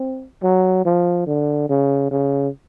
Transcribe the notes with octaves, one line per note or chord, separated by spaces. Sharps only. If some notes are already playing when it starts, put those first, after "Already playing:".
Already playing: C4
F#3
F3
D3
C#3
C#3